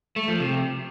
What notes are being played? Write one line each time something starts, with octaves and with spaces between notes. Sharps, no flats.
A3
F3
C3